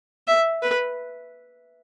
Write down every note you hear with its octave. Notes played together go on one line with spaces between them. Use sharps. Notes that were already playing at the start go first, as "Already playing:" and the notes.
E5
B4